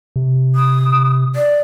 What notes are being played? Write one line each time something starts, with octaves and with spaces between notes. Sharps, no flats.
C3
D#6
D5